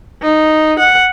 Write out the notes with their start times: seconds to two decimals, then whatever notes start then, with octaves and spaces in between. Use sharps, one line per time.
0.22 D#4
0.79 F#5